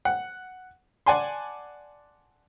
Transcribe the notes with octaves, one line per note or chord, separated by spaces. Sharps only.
F#5
D5 F#5 G#5 A5 C6